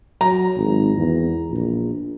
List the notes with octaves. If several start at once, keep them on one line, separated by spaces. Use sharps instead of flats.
F#3 A#5
G#1
E2
A#1